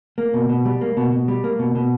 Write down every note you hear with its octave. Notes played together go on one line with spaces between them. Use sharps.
A#3
B2
B2
G3
A#3
B2
B2
G3
A#3
B2
B2